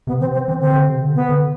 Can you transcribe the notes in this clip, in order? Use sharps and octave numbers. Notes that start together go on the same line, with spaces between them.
C3 B3
E3 C4
C4
E3 C4
D3 C4
D3
C3
D3
B3
D3